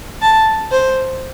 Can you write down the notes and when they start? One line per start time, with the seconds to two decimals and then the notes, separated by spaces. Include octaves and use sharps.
0.22 A5
0.72 C5